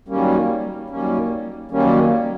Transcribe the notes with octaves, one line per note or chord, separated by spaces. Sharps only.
F#2 D#3 G3 A#3 C#4
F#2 D#3 G3 A#3 C#4
F#2 D#3 G3 A#3 C#4